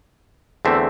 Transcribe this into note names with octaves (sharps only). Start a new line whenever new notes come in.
E2 D3 A3 C4 E5